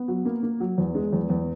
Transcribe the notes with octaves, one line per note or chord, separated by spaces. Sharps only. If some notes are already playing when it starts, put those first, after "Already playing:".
Already playing: B3
F#3
A#3
A#3
F#3
E2
G#3
E2
E2